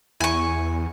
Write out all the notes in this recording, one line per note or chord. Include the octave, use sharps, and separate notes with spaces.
E2 E4 G#5 C#6